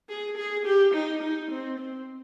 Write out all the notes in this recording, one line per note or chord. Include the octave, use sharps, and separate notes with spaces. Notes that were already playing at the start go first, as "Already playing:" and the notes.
G#4
G#4
G4
D#4
D#4
C4
C4